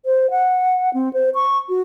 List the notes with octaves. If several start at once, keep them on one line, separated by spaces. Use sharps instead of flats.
C5
F#5
C4
C5
C#6
F#4